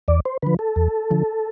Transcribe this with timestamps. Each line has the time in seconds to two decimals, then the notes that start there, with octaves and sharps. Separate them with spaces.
0.08 E2 D5
0.25 C5
0.42 D3 F3 B4
0.59 A4
0.76 E2
1.11 D3 F3